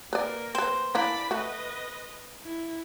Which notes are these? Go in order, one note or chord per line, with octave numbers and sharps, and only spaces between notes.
A#3 A#4 B4 D5
C4 B4 C5
E3 A#3 D4 D5 B5
A3 F#4 B4 D#5
E4